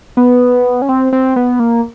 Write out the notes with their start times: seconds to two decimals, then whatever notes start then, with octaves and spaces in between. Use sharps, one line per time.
0.17 B3
0.82 C#4
0.89 C4
1.12 C4
1.36 B3
1.60 A#3